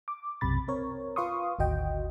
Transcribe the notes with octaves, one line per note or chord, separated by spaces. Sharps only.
D6
B1 F#2 C3 B5 A6
C4 A#4 C#5
F4 B4 F5 C6 C#6 D#6
G#1 D2 F#4 D#5 G5